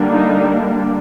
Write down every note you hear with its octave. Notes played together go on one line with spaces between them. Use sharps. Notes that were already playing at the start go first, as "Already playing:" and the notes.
Already playing: D3 G3 A#3 D4
D#4